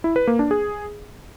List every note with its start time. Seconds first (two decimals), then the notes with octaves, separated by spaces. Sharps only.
0.04 E4
0.16 B4
0.27 A#3
0.39 D4
0.51 G#4